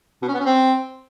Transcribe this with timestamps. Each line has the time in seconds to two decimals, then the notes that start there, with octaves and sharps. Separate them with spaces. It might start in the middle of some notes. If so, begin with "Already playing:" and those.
0.22 B2
0.28 C#4
0.34 B3
0.40 C#4
0.46 C4